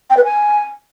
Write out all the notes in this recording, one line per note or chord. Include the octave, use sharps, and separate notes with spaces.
G5
B4
G#5